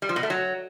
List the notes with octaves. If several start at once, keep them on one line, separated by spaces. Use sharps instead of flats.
G3
F3
B2
A3
F#3